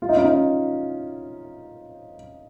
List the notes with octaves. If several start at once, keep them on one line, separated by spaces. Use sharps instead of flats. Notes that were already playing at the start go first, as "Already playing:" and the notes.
F4
D#4
C#4
D#4